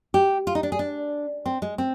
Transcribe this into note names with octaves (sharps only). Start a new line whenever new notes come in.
G4
F4
D#4
D4
G#4
D4
C4
G#3
C4